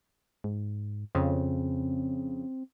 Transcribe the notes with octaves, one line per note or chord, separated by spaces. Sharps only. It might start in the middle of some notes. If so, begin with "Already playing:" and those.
G#2
F2 C#3 C4